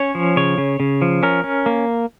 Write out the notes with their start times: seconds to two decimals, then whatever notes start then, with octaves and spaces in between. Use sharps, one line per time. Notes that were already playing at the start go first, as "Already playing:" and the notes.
Already playing: C#4 C#5
0.15 F3
0.37 C#3 C#5
0.58 C#3
0.80 C#3
1.02 F3
1.23 C#4 A#4
1.44 C#4
1.66 A#3